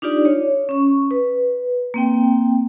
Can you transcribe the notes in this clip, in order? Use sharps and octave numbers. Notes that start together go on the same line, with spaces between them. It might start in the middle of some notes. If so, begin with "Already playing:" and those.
D4 D#4 F4 G4 D5
C#5
C#4 C#6
B4
A#3 C4 G5